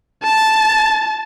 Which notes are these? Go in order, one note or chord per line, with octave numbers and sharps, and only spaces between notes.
A5 A6